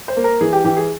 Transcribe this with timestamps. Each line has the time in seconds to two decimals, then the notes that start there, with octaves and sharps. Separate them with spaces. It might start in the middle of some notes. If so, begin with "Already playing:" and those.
0.08 C5
0.17 A#3
0.24 A#4
0.41 E3 G#4
0.53 G4
0.64 E3 G4
0.77 G#4